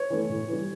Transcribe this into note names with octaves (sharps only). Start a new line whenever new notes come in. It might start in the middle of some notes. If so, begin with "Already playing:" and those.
Already playing: C#5
E3 A3
A2
E3 G3